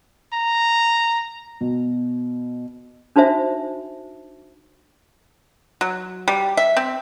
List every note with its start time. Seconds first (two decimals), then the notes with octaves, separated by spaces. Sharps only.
0.34 A#5
1.61 B2
3.16 D4 D#4 F#4 C5 E5
5.81 F#3
6.28 G3
6.57 E5
6.77 C4